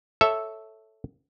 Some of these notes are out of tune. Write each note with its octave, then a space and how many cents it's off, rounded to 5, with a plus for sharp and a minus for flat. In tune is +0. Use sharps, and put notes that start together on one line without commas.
A4 +0 C#5 +0 E5 -5